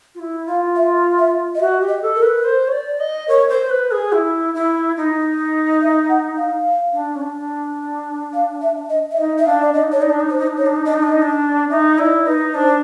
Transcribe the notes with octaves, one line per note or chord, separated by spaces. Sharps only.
F4
E4
F4 F5
E5
E5
D#5
F#4 E5
G4
D#5
A4
A#4
B4
C5
C#5
D5
D#5
A#4 C#5
C5
B4
G#4
E4
E4
D#4
E5
F#5
F5
D4
C#4
D4
F5
E5
D#5
E5
D#4 D#5
E5
D4 F5
D5
D4 D#5
D#4
D4 C#5
D#4 D5
D4
D#4
D4 C5
D#4
D4
D#4 C#5
D4
D#4
D4 D#5
D#4
D4
D#4
D4
D#4 E5
E4 D5
D#5
D5
D#4 B4
D4 C5